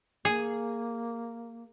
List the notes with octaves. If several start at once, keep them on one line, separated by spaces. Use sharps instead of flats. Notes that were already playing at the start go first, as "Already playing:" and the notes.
A#3 G#4